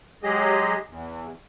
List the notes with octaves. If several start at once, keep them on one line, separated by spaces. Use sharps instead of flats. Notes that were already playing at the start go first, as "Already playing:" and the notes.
F#3 G#3 G4 G#4 D#5
E2